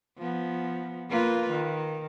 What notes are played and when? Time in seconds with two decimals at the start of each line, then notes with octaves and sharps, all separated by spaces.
0.18 F3 B3
1.09 A#3 F4 B4
1.50 D#3